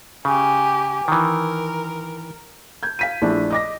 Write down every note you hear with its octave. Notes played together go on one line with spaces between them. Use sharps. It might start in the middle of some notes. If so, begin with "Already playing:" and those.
C#3 G4 G#5
D#3 E3 A#4
G6 G#6
F5 B6 D#7
A#1 A3 D4 E4
D#5 D6 A#6